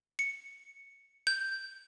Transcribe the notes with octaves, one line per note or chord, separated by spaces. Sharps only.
C#7
G6